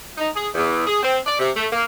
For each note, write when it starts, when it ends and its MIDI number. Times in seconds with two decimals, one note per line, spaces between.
0.18 0.28 63
0.35 0.48 68
0.54 0.84 40
0.86 1.02 68
1.02 1.17 60
1.26 1.37 74
1.39 1.50 48
1.56 1.67 57
1.72 1.81 58